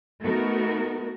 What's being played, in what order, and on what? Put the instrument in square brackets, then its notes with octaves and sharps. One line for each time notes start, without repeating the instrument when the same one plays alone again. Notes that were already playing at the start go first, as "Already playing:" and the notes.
[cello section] A3 B3 D#4 F#4 A#4